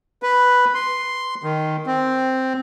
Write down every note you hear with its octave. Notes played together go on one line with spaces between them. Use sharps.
B4
C6
D#3
C4